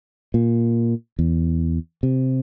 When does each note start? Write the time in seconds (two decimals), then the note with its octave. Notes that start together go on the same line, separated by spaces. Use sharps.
0.34 A#2
1.19 E2
2.03 C3